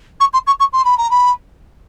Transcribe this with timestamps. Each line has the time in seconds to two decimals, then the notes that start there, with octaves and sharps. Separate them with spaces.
0.20 C#6
0.33 C6
0.47 C#6
0.60 C#6
0.72 C6
0.84 B5
0.98 A#5
1.10 B5